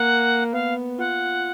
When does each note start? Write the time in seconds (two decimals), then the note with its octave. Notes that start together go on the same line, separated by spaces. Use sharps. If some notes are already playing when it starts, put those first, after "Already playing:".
Already playing: A#3 F#5
0.53 B3 F5
0.99 F4 F#5